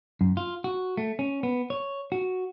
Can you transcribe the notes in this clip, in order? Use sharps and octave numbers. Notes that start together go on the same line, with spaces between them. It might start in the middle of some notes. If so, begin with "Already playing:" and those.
F#2
F4
F#4
A3
C#4
B3
C#5
F#4